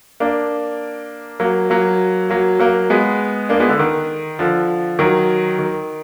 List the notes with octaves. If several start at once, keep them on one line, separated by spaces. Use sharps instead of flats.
A#3 D4
F#3 A#3
F#3 A#3
F#3 A#3
F#3 A#3
G#3 B3
A#3 D4
G#3 B3
D3
D#3
D3 F3
D#3 F#3
D#3